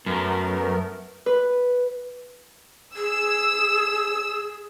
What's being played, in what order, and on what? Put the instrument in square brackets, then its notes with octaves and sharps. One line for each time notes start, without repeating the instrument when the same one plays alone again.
[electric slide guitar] F#2 [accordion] A3 B3 A#4
[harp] B4
[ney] G#4 [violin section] E6